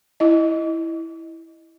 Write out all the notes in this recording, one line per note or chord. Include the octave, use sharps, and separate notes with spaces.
E4 D#5